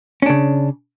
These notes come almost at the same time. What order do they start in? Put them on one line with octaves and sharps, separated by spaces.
C#4 D4 C#3